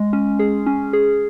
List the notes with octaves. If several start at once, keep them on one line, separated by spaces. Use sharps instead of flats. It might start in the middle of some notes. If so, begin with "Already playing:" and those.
Already playing: G#3
C#4
G#4
C#4
G#4